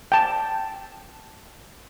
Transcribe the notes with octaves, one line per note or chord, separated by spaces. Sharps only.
G5 A5